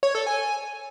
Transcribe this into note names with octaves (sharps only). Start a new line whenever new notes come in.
C#5
A4
G#5